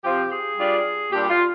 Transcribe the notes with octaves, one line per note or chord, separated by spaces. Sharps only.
C3 F3 C4 F4 G4
G#4
G3 D4 F4
A#2 G3 D4 G4
F4